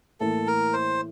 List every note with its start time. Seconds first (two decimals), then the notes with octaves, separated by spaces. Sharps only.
0.20 A2 E3 A#3 E4 A4
0.47 A#4
0.73 C5